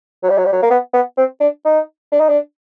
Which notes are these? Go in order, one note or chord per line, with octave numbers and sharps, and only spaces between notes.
F#3
G3
F#3
G3
F#3
A#3
B3
B3
C4
D4
D#4
D4
D#4
D4